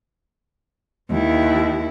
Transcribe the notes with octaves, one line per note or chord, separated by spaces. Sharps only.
D#2 E4